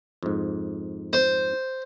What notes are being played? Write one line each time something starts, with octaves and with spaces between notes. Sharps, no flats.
F2 G#2
C5